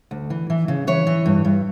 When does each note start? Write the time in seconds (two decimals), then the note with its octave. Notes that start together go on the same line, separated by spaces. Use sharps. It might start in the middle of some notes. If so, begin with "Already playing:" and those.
0.11 D2
0.30 E3
0.50 E3
0.68 C#3
0.87 E3 C#5
1.07 E3
1.26 G2
1.45 G2